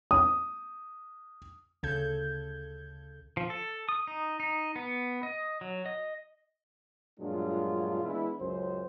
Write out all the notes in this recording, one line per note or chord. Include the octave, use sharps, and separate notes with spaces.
D#6
D2 C#3 A4 G6 G#6
F3
A4
D#6
D#4
D#4
B3
D#5
F#3
D#5
G2 A#2 F#3 G#3 D4 F4
E3 G#3 B3 D4 E4
C#2 F#2 F#3 C5